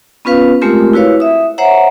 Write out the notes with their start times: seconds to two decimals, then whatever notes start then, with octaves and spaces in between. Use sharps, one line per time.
0.25 B3 C#4 F4 B4 F5
0.61 G#3 A3 C4 F4 G4 A#4
0.93 E4 F#4 B4 C#5 F5
1.20 E5 D#6
1.58 C5 C#5 E5 F#5 A#5